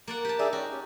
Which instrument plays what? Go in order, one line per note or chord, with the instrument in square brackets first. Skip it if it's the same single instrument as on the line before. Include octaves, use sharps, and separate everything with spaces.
[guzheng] A#3 D5 F#5
G4 A5
[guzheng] D#4 [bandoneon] G#4 D5 E5
[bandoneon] C#4 G5 [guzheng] F#4
[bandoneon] C#4 G4